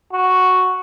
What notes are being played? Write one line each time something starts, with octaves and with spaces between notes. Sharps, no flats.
F#4